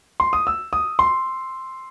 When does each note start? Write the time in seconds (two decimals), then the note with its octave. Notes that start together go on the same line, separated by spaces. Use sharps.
0.20 C6
0.33 D#6
0.47 E6
0.73 D#6
0.99 C6